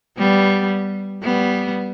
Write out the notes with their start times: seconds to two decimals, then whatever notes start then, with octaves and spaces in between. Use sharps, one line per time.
0.18 G3 B3
1.23 G3 B3